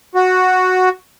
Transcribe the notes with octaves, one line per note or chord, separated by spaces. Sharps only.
F#4